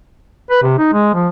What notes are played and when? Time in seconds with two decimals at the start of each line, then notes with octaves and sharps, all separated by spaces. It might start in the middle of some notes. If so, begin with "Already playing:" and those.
0.51 B4
0.62 C3
0.78 D#4
0.93 G#3
1.14 F3